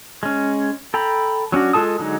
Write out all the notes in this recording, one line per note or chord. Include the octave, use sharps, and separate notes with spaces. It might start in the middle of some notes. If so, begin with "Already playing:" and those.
G#3 C#4
A4 G5 A#5 B5
F#3 C#4 D4 F#4
G#3 F4 A4 A5 D#6
D3 F#3 G#3 D#4